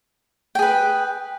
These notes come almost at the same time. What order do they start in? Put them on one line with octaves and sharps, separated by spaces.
G5 G#4 B4